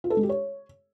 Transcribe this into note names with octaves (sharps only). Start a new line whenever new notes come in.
F4
A4
G#3
G4
C#5